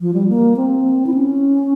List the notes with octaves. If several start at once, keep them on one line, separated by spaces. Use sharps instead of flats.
F3
G3
A#3
C4
E4
C#4